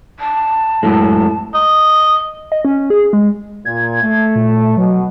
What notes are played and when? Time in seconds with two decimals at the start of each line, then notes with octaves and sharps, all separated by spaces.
0.19 A5
0.83 F#2 A2 G#3
1.54 D#5
2.52 D#5
2.65 C#4
2.90 G#4
3.13 G#3
3.65 A#2 G#6
4.02 A3
4.35 A#2
4.77 B2 F#3